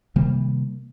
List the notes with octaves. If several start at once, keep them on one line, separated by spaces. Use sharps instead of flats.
C3 D#3 G3 A#3